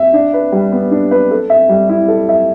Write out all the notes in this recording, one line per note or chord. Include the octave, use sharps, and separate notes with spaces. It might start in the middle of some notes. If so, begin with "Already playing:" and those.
Already playing: E5
D4
B4
G3
B3
D4
B4
A4
E5
G3
E4
A4
E5